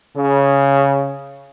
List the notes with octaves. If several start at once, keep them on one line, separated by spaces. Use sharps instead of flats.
C#3